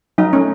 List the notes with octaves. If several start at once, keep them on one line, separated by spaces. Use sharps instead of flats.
F#3 D#4
A3 C#4